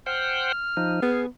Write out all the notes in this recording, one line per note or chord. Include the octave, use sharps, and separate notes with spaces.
C5 F#5 G5 F6
F3 D#4
B3 G#4